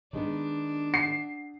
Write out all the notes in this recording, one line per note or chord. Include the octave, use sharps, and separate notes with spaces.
D#3 G#3 B3 D4
F#5 C7